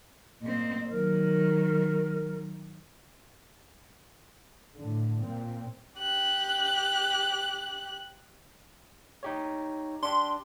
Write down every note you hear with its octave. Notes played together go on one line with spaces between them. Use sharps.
A#2 C4 D#5
D#3 F#3 A#4
A2 D3
A#2 C4
G4 F#6
D#4 G4 C#5
D4 G4 C6